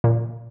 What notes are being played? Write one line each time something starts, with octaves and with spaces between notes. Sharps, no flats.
A#2